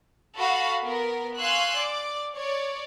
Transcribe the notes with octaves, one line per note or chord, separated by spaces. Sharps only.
F#4 A4 F5 B5
B3 A#4
F5 G#5 C6 C#6 E6 F#6
D5 D6
C#5 D5